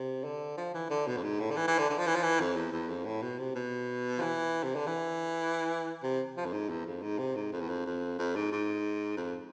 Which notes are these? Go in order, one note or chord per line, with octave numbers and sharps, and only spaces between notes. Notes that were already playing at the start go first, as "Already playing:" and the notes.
Already playing: C3
D3
F3
E3
D3
B2
F2
G#2
A2
D3
E3
E3
D3
D3
F3
E3
F3
E3
F2
E2
E2
F2
A2
B2
C3
B2
F3
E3
C3
D3
E3
C3
F3
F2
G#2
E2
F2
G#2
C3
G#2
F2
E2
F2
F2
F2
G#2
G#2
F2